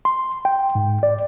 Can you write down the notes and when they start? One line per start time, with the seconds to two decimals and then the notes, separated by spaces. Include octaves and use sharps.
0.05 C6
0.45 G5
0.75 G#2
1.03 D5